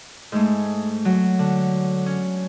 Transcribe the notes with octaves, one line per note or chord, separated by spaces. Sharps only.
G#2 G#3 A3
F#3
D3
C#4